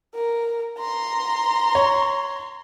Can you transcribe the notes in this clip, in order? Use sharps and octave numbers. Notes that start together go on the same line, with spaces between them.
A#4
A#5 C6
C#5